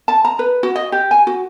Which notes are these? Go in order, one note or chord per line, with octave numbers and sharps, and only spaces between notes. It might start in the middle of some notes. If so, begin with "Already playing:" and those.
A5
A#5
B4
F#4
D#5
G4
G#5
F#4